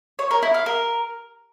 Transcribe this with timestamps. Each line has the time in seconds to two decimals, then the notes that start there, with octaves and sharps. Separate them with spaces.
0.19 C#5
0.31 A#4
0.42 E4
0.54 F5
0.66 A#4